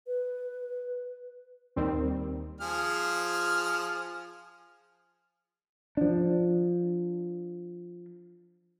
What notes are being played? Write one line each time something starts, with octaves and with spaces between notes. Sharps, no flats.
B4
D#2 D#3 G3 C4
F3 G#4 F6
F3 D4